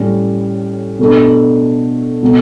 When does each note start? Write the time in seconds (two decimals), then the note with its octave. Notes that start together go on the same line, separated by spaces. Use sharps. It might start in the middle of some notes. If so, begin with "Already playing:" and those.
Already playing: A2 G3 C#4
0.99 B2 A3 D4
2.23 B2 A3